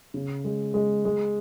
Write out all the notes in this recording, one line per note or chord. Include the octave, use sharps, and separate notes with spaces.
C#3
G#3
G#3
G#3